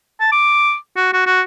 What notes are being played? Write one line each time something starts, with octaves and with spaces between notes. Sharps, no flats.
A5
D6
F#4
F#4
F#4